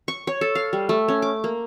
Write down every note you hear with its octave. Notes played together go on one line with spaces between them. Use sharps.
C#6
C#5
A4
F5
G3
A3
C#4
D6
A#3